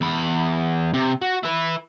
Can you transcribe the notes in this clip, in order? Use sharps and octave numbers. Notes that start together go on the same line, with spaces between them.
E2 B5
C3
F#4
E4 B4